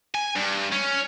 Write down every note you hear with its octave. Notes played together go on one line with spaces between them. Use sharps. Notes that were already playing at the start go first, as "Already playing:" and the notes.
G#5
G2
C#4